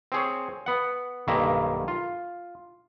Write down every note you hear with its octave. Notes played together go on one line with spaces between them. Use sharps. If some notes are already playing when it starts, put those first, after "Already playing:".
C4 G#4 C#5
B3 F#5
B1 G2 D#3 A#3 E5
F4